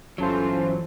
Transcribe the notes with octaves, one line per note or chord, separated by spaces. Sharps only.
G1 E3 F#3 C#4 F4 A4 C5